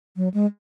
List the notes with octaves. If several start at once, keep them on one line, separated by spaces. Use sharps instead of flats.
F#3
G#3